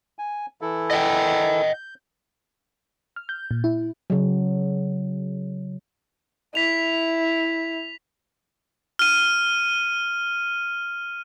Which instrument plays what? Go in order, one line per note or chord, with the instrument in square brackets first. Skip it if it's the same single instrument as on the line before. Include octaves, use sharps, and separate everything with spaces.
[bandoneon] G#5
E3 E4 A4
[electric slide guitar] D#5 F#5 G5
[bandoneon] G6
[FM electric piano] F6
G6
A#2
E4
[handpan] C#3 F#3
[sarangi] E4 [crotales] B6 F7
[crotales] F6 D#7